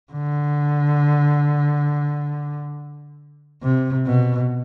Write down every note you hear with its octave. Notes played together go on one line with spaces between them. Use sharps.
D3
C3
B2